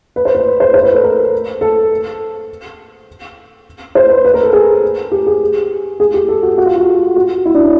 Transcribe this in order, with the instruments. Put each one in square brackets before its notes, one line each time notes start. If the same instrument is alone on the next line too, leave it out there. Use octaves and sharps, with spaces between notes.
[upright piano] B4
C5
B4
C5
C5
B4
A4
A#4
A4
C5
B4
B4
A#4
A4
G#4
G4
G#4
G#4
G4
A4
F#4
F#4
F4
F#4
F#4
E4
D4
C#4